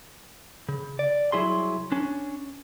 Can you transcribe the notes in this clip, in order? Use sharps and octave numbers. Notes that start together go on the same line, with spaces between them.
C#3
D5
C2 G2 F#3 E4 G#4 C6
C#4 D4